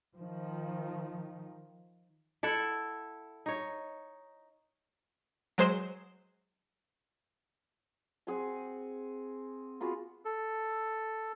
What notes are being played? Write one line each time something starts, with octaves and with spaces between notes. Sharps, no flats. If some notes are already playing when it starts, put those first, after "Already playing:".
D#3 F3
E4 A4 E5 F#5
D#4 C#5
F#3 G#3 C5 C6 E7
C4 G#4 F#5 G#5
B3 F4 F#4 G#4
A4